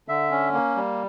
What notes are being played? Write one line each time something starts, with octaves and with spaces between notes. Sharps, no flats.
D3 E5
C#4
A#3
G3